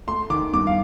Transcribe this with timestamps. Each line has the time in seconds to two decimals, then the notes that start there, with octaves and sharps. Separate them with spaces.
0.07 A3 C6
0.30 D#3 D6
0.53 G2 D6
0.67 F5